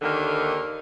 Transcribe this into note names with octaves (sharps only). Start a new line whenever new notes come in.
D#2 D3 D#3 A#3